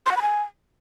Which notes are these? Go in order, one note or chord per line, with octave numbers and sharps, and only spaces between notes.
C6
F#5
B5
G#5